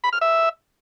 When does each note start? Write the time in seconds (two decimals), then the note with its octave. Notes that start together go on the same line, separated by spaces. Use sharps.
0.04 B5
0.13 F6
0.21 E5